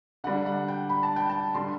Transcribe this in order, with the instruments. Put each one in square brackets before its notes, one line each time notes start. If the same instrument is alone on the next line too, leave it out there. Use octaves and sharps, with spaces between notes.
[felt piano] D3 G3 D4 F#5
F#5
G5
B5
A5
G5
A5
D3 G3 C6